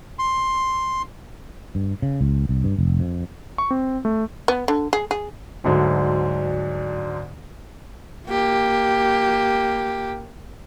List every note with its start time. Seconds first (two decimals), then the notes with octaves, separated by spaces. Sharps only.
0.19 C6
1.75 G2
2.02 C#3
2.21 C#2
2.49 C2
2.64 G2
2.78 F1
3.00 F2
3.58 C#6
3.71 C4
4.05 A3
4.48 B3
4.68 D3
4.93 G#4
5.11 G#4
5.64 D2 G#2 D3 F#3
8.27 A#3 G4